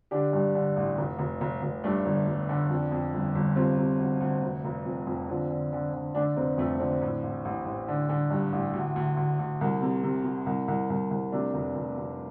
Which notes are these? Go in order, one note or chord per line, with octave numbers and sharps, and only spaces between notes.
D3 D4 G4
G2
D3
A1
F1
F1
F1
F1
G2 A3 D4
G1
G1
D3
F2
F2
G1
G1
C3 C4 F4
C3
D2
D2
F1
F1
F2
F2
D3 C4 F4
D3
D3
D3
D3 A3 D4
F1 C4
F2 A3
D3 C4
A2
A1
A1
A1
D3
D3
G2
A1
D2
D2
D2
D2
C2
C3
C3
C3
C2
C2
C2
C2
C3 A3 D4
F1
F1
F1